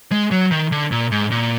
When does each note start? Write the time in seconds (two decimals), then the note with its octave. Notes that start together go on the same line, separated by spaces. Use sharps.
0.12 G#3
0.31 F#3
0.51 D#3
0.72 D3
0.92 A#2
1.11 G#2
1.31 A#2